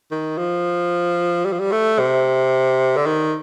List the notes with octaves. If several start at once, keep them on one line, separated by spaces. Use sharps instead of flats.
D#3
F3
G3
F3
G3
A3
C3
D3
D#3